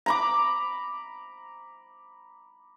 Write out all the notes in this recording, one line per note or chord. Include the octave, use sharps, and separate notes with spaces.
A#5 B5 D6